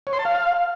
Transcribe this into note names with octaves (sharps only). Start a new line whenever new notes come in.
C#5
C6
A5
F5